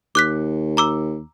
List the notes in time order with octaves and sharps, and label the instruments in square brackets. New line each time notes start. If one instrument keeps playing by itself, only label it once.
[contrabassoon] D#2 [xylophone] D6 F#6 B6
[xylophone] A#5 D6 E6